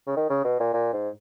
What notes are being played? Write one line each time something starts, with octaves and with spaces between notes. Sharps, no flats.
C#3
D#3
C#3
B2
A#2
A#2
G#2